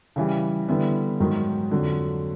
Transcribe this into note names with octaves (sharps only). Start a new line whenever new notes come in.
C#3 E3 G3
D3 G3 B3 E4
G#2 D#3 F#3
F2 D3 F#3